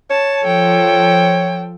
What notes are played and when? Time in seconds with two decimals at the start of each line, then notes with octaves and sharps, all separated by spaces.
0.11 C#5 A5
0.44 F3 A4 G5